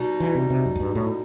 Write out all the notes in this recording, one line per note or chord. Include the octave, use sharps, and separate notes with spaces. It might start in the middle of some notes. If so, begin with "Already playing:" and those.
Already playing: B2 G3 D#4
E3
C3
C3
F#2
F#2
G2
A2